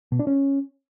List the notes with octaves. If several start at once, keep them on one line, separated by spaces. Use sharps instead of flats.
B2
D4
C#4